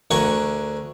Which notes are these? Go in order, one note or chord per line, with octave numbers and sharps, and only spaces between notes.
D2 D4 A#4 F#5 G#5 C#6